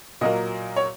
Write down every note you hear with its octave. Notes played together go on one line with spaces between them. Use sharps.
A#2 F#3 A#3 D#5
C#5